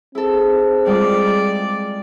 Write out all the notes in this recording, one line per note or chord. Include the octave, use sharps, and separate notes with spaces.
C4 E4 G#4 A4
G3 G#3 F4 D5